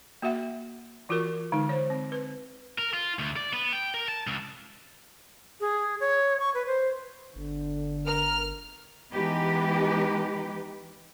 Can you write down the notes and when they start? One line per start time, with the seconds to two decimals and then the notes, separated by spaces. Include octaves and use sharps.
0.22 A#3 F#4 E5 F#5
1.09 E3 F4 F#4 A#4 C#6
1.52 D3 G#3 D#4
1.69 C5 C#5
1.90 C4
2.12 B4
2.78 A#4
2.94 F4
3.19 D2
3.37 D5
3.53 B3
3.73 G5
3.94 A#4
4.08 A5
4.27 C#2
5.61 G#4
6.00 C#5
6.40 C#6
6.55 B4
6.67 C5
7.36 G1 D3
8.06 A#4 F6
9.13 E3 G#3 B3 D#4 G4 B4